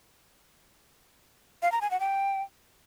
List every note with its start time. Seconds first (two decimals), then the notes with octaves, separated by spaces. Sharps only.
1.62 F5
1.72 A#5
1.81 G#5
1.91 F#5
2.00 G5